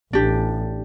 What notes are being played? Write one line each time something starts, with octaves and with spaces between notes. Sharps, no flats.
A1 D4 G4